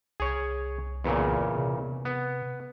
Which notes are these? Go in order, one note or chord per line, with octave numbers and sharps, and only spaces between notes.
C2 G#4 C#5
E2 A#2 C#3
C3
B3